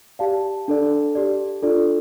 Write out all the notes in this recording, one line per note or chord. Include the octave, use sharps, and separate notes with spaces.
G4 D5 F5 A5
D4 A4 D5
G4 D5
D4 F4 A4 D5